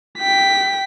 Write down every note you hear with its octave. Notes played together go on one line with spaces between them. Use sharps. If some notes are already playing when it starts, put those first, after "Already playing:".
G5 B6